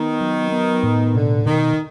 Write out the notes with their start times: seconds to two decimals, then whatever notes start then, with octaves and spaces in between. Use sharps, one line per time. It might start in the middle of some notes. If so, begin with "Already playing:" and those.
Already playing: D#3 B3
0.21 F#3
0.52 B3
0.83 A2
1.15 B2 D3
1.46 B2 D#3